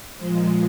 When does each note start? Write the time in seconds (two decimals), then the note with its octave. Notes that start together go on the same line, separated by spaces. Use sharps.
0.18 A#2 F3 G#3 C5